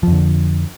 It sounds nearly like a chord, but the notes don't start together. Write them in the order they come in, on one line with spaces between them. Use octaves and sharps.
F3 F2 D3